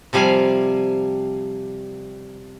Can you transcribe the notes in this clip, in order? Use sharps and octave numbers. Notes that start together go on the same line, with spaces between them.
C3 F3 G3 F5 G#5